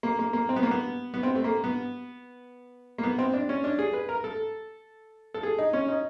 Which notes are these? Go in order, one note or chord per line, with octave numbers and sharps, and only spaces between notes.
A#3
A#3
A#3
C4
B3
A#3
B3
B3
C4
A3
A#3
B3
A#3
B3
C4
D4
C#4
D4
G#4
B4
A#4
A4
A4
G#4
D#4
C#4
D#4